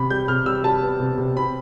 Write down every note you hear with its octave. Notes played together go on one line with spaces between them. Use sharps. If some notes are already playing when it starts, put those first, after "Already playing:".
Already playing: C3 B5
G3 G6
C3 F6
G3 E6
G3 A5
B3
C3
C3
C4 B5